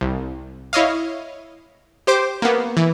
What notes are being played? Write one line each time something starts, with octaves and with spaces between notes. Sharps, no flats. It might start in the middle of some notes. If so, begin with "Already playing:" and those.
C2
E4 C#5 D#5 F5
G4 C5 D6
A#3 B3
E3